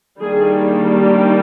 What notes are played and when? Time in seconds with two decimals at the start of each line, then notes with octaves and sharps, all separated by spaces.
0.20 D#3 G3 A#3 D4 G#4
1.00 G4